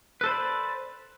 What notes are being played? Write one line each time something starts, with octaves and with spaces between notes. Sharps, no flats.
A4 B4 C5 D5 B5